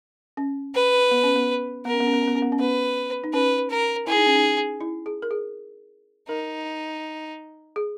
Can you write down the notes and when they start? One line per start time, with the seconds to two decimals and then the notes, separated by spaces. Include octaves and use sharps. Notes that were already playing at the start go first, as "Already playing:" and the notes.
0.37 C#4
0.75 B4
1.11 B3
1.24 C#4
1.36 B3
1.85 B3 A#4
1.93 C#4
2.00 B3
2.07 C#4
2.13 B3
2.21 C#4
2.28 B3
2.35 C#4
2.42 B3
2.52 C#4
2.59 B3 B4
3.24 D#4
3.33 C#4 B4
3.70 A#4
4.07 E4 G#4
4.16 D#4
4.26 C#4
4.35 D#4
4.81 E4
5.06 G#4
5.22 A#4
5.31 G#4
6.29 D#4 A#4
7.76 G#4